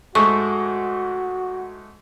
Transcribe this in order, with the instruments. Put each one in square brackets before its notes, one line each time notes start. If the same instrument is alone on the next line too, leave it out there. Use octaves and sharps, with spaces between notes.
[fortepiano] G#2 G#3 A3 [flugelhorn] F#4 [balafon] C#6